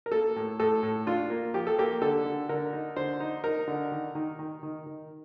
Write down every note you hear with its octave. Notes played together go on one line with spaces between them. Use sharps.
A#4
A#3 A4
A2
A2 A4
A2
D4 F4
A#3
F3 G4
A4
A#3 G4
D3 A4
D3
D3 A#4
D#4
D3 C5
D#4
D#4 A#4
D3
D#3
D#3
D#3
D#3
D#3